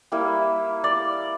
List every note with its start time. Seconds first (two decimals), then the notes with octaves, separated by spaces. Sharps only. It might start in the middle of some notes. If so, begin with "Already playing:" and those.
0.12 G3 A#3 E4
0.84 D5